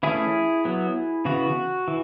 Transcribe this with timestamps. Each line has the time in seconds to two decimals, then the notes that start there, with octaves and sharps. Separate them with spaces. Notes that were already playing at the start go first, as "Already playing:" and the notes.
0.03 E3 A3 C#4 E4 G#4
0.65 F#3 B3
1.25 C#3 E3 B3 F#4
1.88 E3